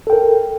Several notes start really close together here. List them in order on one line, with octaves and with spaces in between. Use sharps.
A4 G5 A#4